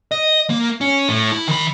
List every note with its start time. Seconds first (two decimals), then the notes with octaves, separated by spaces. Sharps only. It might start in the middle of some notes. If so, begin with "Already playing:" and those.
0.11 D#5
0.50 A#3
0.81 C#4
1.09 A2
1.32 E4
1.48 D#3 B5